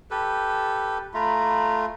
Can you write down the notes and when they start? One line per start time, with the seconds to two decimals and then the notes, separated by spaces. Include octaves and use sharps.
0.11 G4 A4 B4
1.14 A3 F4 A#5 B5